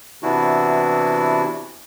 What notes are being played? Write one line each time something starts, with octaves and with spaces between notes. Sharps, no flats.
C3 E3 B3 D4 E4 F#4